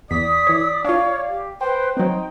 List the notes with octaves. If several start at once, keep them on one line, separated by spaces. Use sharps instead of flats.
E2 D5 D#6 B6
E3 C#5
D4 F4 C#5 F5
G4
B4 C5 G5
F#3 C4 D#4 C5